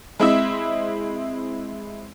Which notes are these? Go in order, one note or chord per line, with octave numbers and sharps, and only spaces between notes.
G#3 C4 E4 D#5 E5 E6